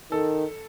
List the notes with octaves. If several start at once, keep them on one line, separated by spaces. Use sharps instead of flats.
D#3 A4